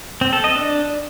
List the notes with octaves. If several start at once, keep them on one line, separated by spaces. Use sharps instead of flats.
C4
A4
D#5
D4